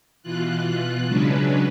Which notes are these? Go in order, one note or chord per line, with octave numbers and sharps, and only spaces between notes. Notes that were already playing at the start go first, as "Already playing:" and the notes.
B2 E3 F4 F#6
C#3 F#3 G#3 C#4 D4 B4